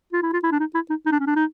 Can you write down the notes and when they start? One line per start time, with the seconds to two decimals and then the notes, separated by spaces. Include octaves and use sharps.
0.13 F4
0.23 E4
0.33 F4
0.43 E4
0.51 D4
0.59 D#4
0.74 E4
0.90 D#4
1.06 D#4
1.12 D4
1.20 C#4
1.26 D4
1.36 D#4